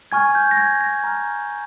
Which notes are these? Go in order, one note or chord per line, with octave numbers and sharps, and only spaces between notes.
G#5 C#6 F6 G#6
G6
A#6
G#6
A#6
A#5 F6